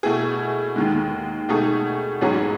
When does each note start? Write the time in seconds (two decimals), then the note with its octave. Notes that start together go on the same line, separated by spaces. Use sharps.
0.03 B2 A3 E4 G#4
0.76 D#2 D#3 G#3
1.49 B2 A3 D#4 G#4
2.21 A1 G#2 F#3 C#4 G#4